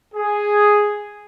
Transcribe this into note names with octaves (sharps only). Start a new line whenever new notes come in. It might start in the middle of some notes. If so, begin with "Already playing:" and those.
G#4